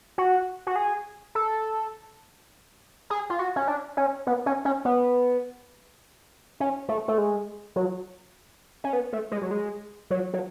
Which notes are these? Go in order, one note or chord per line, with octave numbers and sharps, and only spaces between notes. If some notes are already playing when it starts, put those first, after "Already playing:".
F#4
F#4
G#4
A4
G#4
F4
F#4
C#4
D4
C#4
B3
C#4
C#4
B3
C#4
A3
A3
G#3
F#3
C#4
B3
A3
G#3
F#3
G#3
F#3
F#3